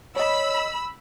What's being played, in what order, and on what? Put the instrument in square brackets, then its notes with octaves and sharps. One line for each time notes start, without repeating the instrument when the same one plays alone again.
[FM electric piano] C#5 D#5 [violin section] B5 E6